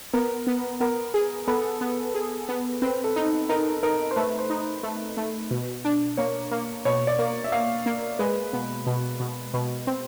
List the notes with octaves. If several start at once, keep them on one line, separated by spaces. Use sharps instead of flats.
B3 A#4
B3
B3 A#4
G#4
B3 A4
B3
G#4
B3
C4 B4
A4
D#4
D#4 A#4
D#4 A#4
C5
A3 B4
C5
D#4
A3
A3
B2
D4
A#3 C#5
A#3
B2 C#5
D5
A#3
E5
A#3 F5
A#3
G#3 B4
B2
B2
B2
B2
C4